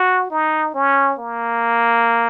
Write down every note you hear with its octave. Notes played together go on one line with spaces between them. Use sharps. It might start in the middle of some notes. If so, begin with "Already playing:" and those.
Already playing: F#4
D#4
C#4
A#3